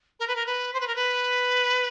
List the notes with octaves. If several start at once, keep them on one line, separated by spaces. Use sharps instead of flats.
A#4
B4
A#4
B4
C5
B4
A#4
B4